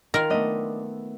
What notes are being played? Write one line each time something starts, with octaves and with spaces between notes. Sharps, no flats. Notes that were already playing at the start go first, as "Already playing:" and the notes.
D#3 F4 A#4
A3 B3 D4 D#5